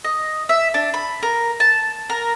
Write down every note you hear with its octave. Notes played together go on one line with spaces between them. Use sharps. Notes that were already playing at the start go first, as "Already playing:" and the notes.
D#5
E5
D4
B5
A#4
A5
A#4